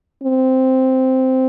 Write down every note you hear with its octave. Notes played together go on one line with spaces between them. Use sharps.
C4